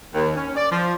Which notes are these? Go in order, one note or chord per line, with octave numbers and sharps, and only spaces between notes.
D#2
C#4
D5
F3